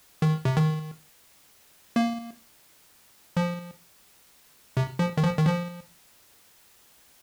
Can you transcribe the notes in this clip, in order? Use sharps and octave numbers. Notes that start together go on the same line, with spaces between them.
D#3
C3
D#3
A#3
F3
C3
F3
D#3
F3
D#3
F3